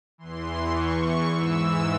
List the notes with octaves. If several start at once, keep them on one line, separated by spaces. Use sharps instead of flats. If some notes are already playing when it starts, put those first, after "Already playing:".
E2 E3 C6
C#6
G#2 E3 E6